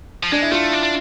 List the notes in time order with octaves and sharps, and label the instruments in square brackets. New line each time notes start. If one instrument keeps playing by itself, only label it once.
[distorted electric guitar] F3
[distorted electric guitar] G#3 [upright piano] D4
[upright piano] E4
[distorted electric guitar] A3 [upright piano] F4
[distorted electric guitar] D4
D4